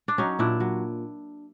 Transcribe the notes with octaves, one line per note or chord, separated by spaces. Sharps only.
D4
F#3 C#4 D#4
A#2 D4 E4
F#3